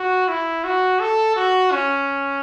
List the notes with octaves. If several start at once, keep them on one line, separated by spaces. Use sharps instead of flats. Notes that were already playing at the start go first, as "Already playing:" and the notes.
Already playing: F#4
E4
F#4
A4
F#4
C#4